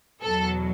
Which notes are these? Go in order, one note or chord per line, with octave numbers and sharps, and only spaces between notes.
E2 B2 F#3 A4